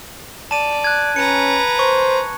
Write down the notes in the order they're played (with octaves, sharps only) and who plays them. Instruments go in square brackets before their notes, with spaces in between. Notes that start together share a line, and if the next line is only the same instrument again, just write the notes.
[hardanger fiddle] D5 [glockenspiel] A5 D#7
[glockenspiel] F#6 G#6
[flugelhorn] C#4 [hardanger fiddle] B4 A#5 [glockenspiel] C#7
[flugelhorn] C5 [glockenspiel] C#6